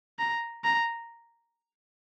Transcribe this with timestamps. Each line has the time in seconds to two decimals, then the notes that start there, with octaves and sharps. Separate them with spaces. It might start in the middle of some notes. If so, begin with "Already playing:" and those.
0.19 A#5
0.64 A#5